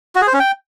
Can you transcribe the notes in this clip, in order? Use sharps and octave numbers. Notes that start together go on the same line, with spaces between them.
F#4
G#4
C5
C#4
G5